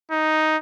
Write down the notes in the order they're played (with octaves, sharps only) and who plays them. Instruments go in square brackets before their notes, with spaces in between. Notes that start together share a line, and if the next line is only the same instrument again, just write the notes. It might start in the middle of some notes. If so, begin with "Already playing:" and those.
[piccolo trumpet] D#4